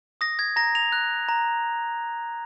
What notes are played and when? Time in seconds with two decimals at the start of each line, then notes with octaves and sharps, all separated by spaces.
0.21 D#6 A#6
0.39 G#6
0.56 A#5 A#6
0.75 F7
0.92 F#6
1.29 A#5